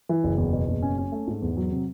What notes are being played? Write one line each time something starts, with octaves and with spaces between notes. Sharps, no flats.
E3
F#1
E2
B2
F#1
C#4
C#4
A3
G#2
E2
F#3
C3